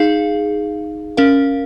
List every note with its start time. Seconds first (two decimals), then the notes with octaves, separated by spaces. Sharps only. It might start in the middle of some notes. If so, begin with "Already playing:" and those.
Already playing: D#4 G#4 F5
1.17 C#4 A#4 F5